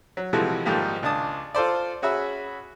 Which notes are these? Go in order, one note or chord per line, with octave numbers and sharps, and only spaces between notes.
F#3
C3 E3 F3 G#3 A3 F#4
G#2 D#3 F3 G3 A3 A#3
C#2 D4 A5 D#6
F4 A4 C5 D5
C#4 F#4 G#4 E5 B5